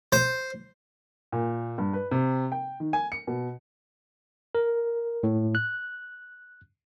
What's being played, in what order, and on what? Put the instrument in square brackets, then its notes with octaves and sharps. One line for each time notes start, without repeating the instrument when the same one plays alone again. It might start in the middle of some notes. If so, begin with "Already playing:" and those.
[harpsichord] C5
[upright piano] A#2
G2
B4
C3
G5
D#3
G#5
C#7
B2
[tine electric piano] A#4
A2
F#6